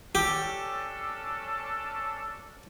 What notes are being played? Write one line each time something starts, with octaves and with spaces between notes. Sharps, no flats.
C#4 D4 G4 A4